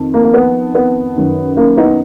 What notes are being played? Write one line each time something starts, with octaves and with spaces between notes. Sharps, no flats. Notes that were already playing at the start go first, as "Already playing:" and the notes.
Already playing: F2 D#3
A#3
A#3
B3
B3
F#2 D#3
A#3 C#4
B3 D#4